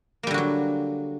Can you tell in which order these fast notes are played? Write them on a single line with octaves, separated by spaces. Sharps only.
A#3 G3 D3 F#4 F#3